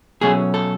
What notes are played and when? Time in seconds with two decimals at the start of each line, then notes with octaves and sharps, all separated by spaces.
0.21 B2 F#3 A3 C#4 G#4
0.54 A4